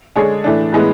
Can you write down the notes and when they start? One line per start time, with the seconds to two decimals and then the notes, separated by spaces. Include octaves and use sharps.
0.16 D3 G#3 D4 G#4 C#5
0.44 A2 E3 A3 D4
0.72 A2 E3 G#3 B3